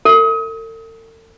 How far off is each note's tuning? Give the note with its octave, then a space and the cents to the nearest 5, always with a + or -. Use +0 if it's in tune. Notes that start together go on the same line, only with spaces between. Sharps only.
A4 +45